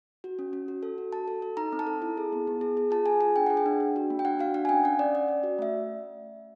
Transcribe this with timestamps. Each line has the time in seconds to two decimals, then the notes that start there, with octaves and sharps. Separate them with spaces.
0.24 F#4
0.39 C#4
0.53 C#4
0.68 F#4
0.83 A4
0.98 F#4
1.13 F#4 A5
1.28 A4
1.42 A4
1.57 D#4 A#5
1.73 C4
1.79 A5
1.87 A4
2.02 E4
2.17 G#4
2.32 B3
2.47 B3
2.61 G#4
2.77 G#4
2.91 F4 A5
3.06 G#4 G#5
3.21 F4 G#5
3.36 D4 G5
3.47 G#4 F#5
3.57 G5
3.66 D4
3.80 D4
3.96 F#4
4.10 A#3
4.19 G5
4.25 D4 F#5
4.39 F#4 F5
4.54 D4 F#5
4.65 G#5
4.69 C#4 G5
4.84 C#4 F#5
4.99 C#4 D5
5.15 C#4 D5
5.28 C#4
5.43 F#4
5.59 A3 E5